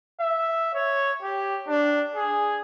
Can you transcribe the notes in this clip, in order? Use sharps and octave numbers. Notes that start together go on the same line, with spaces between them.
E5
C#5
G4
D4
G#4